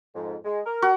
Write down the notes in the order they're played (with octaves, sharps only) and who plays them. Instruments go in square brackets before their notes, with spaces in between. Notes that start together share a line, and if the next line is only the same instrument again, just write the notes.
[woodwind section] F2 G#2
G#3
A#4
[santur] F#4